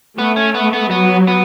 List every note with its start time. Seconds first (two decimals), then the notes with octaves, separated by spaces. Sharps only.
0.17 A3 B3
0.36 C#4
0.54 B3
0.73 B3
0.91 F#3 B3
1.27 B3